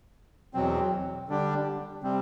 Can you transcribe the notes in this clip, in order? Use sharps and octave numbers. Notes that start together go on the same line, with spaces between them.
E2 B2 F#3 C4
D3 G3 D4 G4
C3 G3 C4